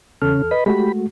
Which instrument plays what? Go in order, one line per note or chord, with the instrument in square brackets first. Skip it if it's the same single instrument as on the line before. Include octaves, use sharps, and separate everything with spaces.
[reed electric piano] E2 A4 F6 [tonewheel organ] C#3 C#4
[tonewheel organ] B4 D#5 B5
[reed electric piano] G#3 A3 F#4 [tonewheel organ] G4 B5